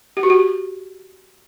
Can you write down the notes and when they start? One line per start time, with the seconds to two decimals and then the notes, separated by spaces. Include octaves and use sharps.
0.17 G4
0.23 F#4
0.30 G4